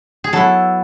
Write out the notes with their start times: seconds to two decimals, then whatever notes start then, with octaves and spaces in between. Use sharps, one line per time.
0.24 G#4
0.33 F#3 B3 E4 A4